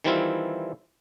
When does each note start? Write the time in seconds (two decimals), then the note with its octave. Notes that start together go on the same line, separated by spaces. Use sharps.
0.04 D#3 E3 G3 C4 E4 F4